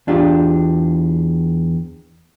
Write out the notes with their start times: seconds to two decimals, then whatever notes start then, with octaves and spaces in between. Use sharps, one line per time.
0.07 E2 D4 F4 G4